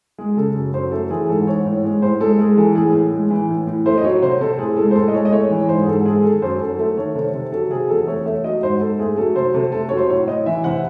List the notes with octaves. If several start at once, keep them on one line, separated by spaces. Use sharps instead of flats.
G#3 G#4
C#3 A4
F#2
F#2 C5
A3 A4
E3 G#4
G#2 A4
G#2 C#5
A2
G#3
A2 C5
G#3 A4
G#3 G#4
E3 A4
A2 G#4
A2
G#3
E3
A2
A2
A3 C5
D#5
F#3 C#5
C3 C5
C3 A4
A2 G#4
G#3 A4
C5
A2 A4
D#5
G#3 C#5
D#5
A3 C#5
E3
G#2 C5
G#4
G#2 A4
A4
G#3 G#4
D#3 A4
F#2 C5
F#2 A4
A3 A4
D#3 C#5
C3 A4
C3
F#3 A4
C3 G#4
E2 A4
A3 C#5
A3 E5
F#3 D#5
G#2 C5
G#2 A4
A3 G#4
F#3 A4
C3 C5
C3 A4
A3 A4
F#3 C#5
C5
A2 C#5
A2 D#5
E3 E5
C3 F#5